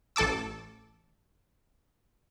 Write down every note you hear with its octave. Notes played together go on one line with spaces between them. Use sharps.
A1 A4 A5 D6 E6